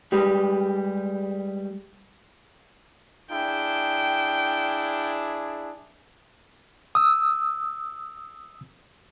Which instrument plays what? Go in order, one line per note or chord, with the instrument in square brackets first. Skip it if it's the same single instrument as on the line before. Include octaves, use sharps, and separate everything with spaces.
[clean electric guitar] G3 G#3 G4 B4
[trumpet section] D4 E4 G#4 [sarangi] G5
[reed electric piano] D#6 E6